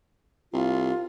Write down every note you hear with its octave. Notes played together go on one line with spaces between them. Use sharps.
C2 F4